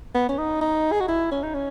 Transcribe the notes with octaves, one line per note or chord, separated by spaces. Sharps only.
B3
C#4
D#4
D#4
G#4
F#4
E4
C#4
D#4
C#4